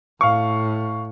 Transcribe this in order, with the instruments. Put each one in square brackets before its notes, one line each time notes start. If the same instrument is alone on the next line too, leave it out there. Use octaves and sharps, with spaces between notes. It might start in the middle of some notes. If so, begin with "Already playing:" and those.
[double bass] A2 [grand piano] F5 C#6